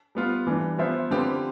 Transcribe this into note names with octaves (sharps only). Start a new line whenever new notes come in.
G3 B3 F4
E3 G3 D4
F3 B3 F4 C5 E5
D3 F3 C4 G4 B4